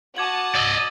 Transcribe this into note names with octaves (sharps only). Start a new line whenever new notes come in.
F#4 A5 D6 D#6 G#6 F#7
D5 D#5 E6 A6